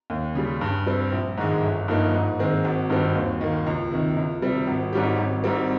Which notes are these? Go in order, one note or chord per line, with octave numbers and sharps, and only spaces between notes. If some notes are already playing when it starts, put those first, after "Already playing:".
D#2
C#3 G3
G2
G3 C4
A#1
G#2 D#3 G#3
G1
G2 F3 A#3 D#4
G#2
D#3 G#3 C4
G#1
G2 D#3 G3 C4
D#2
D#3 A#3
C#2
C3 D#3
C#2
C3 G3 C4
G#1
G#2 G3 C#4 G4
G#1
G#2 G3 C4